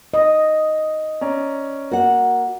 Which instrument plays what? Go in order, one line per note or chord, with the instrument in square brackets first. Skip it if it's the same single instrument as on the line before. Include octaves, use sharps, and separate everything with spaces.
[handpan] D#5
[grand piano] C#4 D5 A#5
[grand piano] A#3 [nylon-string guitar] F#4 F#5